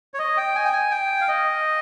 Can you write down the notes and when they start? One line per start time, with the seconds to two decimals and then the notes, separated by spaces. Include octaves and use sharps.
0.14 C#5
0.19 D#5
0.37 G5
0.56 G#5
0.65 G5
0.73 G#5
0.91 G5
1.21 F5
1.28 D#5